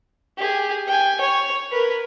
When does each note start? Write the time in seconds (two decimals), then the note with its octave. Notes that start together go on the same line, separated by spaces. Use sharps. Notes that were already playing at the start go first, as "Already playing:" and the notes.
0.37 G4 G#4
0.87 G5 G#5
1.20 C#5
1.71 A#4 B4